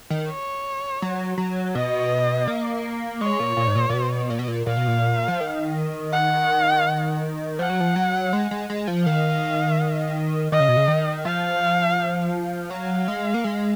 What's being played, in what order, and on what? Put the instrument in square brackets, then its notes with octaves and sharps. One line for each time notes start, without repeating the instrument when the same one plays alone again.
[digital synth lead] D#3
[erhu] C#5
[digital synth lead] F#3
F#3
[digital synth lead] B2 [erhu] D#5
[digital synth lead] A#3
[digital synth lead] G#3 [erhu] C#5
[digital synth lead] A#2
A#2
G#2
A#2
A#2
B2
A#2
B2
A#2
[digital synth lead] A#2 [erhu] F5
[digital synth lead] B2
A#2
F3
D#3
[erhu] F#5
[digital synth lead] F3 [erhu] F#5
[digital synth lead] F#3
F3
F#3
G#3
G#3
G#3
F3
[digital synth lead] D#3 [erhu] F5
[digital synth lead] D#3 [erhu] D#5
[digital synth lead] C#3
B2
C#3
D#3
[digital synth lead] F3 [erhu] F5
[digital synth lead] F#3 [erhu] F5
[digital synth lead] G#3
A#3
G#3